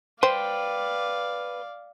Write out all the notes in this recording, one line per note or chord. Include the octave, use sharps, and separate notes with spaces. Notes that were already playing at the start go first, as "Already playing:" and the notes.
B4 C5 D5 F5 G5